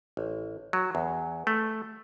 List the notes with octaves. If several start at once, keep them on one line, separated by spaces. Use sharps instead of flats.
A1
F#3
E2
A3